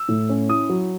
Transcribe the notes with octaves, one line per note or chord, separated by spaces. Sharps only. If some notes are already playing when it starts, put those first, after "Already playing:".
Already playing: E6
A2
C#4
E4 D#6
F#3